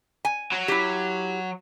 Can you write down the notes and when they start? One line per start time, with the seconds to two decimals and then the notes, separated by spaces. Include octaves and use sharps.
0.25 G#5
0.52 F#3
0.68 E4 G4